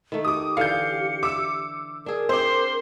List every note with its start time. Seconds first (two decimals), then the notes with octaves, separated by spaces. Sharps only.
0.12 D#3 A3
0.25 G4 D6 D#6
0.57 D3 E3 F5 G6 C#7
1.23 E5 D6 E6
2.06 D4 G#4 A#4
2.29 C4 C5 C6 D6